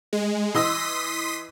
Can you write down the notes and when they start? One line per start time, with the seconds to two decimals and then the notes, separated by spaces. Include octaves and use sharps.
0.13 G#3
0.54 E3 D#5 C6 D#6 E6 B6